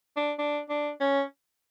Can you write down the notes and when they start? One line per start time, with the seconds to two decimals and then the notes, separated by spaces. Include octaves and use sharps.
0.17 D4
0.39 D4
0.69 D4
1.00 C#4